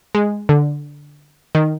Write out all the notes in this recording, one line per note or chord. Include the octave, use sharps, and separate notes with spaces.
G#3
D3
D#3